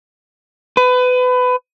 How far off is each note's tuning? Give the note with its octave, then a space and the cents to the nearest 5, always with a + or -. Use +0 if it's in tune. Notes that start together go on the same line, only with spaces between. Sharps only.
B4 +25